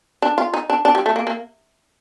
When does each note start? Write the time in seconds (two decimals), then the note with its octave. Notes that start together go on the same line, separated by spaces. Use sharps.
0.22 D4
0.38 F4
0.54 D#4
0.70 D4
0.85 D4
0.95 G3
1.06 A3
1.16 A#3
1.27 A#3